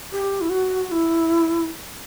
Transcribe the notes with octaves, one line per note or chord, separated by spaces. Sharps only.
G4
E4
F#4
F#4
E4